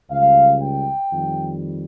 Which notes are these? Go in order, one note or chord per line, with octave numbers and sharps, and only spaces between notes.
C#2 C#3 G3 F5
G5
F2 D#3 G3